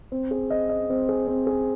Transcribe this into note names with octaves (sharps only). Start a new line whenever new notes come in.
C4
G#4
D#5
D#5
C4
G#4
C4
G#4